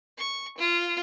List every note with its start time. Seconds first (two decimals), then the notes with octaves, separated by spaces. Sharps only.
0.18 C#6
0.58 F4